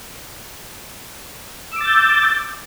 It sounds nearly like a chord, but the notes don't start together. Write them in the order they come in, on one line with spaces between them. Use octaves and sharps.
E6 D6 A6 G6